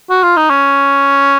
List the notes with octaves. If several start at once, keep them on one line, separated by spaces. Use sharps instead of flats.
F#4
F4
D#4
C#4